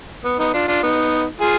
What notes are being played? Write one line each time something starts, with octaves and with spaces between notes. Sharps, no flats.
B3
B3 D#4
D4 F4
D4 F4
B3 D#4
F4 G#4